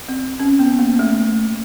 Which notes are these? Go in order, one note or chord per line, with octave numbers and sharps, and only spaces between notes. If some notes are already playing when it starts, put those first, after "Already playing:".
C4
C#4
B3
A#3
A3